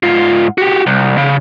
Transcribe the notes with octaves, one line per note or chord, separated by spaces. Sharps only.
G#2 F4
F#4 G4
C2
C#3